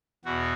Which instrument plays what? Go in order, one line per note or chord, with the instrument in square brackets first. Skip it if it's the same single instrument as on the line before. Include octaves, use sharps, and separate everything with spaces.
[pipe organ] E2 B2 F#4